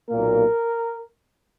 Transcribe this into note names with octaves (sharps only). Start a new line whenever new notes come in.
B1 A#2 A#3 A#4